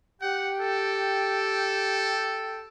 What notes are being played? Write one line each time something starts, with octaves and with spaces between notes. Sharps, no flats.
G4 F#5 G5
A4